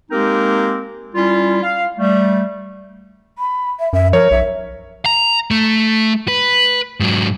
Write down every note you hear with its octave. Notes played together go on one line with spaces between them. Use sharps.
G#3 A#3 C4 D#4 G4 A#4
G3 C#4 E4 F4
F5
G3 A3
B5
E5
F#2 E5
F3 A#4 C#5
B1 E5
A#5
A3
B4
G#2 F#3